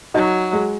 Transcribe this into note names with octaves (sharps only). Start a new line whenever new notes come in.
F#3 D#4 F#4
G#3